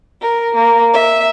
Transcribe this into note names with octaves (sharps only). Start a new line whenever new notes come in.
A#4
A#3
E5